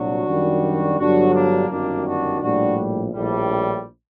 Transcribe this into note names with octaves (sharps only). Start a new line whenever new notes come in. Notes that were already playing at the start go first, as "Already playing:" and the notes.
Already playing: C2 A#2 F#3 D4 F#4
F#2 D#3 G3
G1 G2 D3 F#3 D4 F#4
A#3 D4
G1 F#2 D#3 G3 A#3 D4
D4 F#4
A#1 A2 G3 D4 F#4
A#1 A2 G3